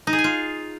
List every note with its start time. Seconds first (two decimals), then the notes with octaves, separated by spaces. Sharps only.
0.07 D#4
0.13 G#4
0.19 G#5
0.24 F4